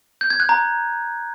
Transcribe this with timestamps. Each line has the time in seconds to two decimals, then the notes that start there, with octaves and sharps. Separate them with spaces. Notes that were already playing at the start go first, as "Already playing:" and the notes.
0.21 G6
0.30 G#6
0.40 F#6
0.49 A#5